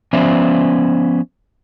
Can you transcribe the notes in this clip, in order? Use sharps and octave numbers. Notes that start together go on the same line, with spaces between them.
F3 B3 C#4 C5 D5 E5